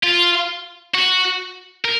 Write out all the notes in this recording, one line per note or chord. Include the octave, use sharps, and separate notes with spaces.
F4
F#4
A#4